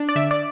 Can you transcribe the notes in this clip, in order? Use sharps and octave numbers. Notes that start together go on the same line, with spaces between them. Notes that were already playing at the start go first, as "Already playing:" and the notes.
Already playing: D4
D5
D3 E5
D5